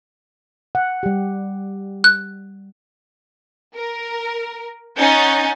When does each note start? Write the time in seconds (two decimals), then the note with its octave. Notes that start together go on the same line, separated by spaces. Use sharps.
0.75 F#5
1.03 G3 G4
2.04 F#6
3.76 A#4
4.98 C#4 D#4 F#5 G#5 G6 A6